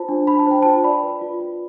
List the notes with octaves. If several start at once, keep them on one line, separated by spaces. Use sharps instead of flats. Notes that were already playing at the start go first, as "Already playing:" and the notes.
Already playing: F4 C5 A5
D4
D4 B5
A5
C5 G5
F4 A5
D5 B5
B4
F4
F4